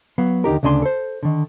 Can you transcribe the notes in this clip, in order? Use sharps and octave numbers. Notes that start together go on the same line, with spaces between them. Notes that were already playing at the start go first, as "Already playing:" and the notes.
F#3 B3 F5
D#2 D3 D#4 G4 A#4
D2 C#3 D4 G#5 C6
A4 C5
D3 D#3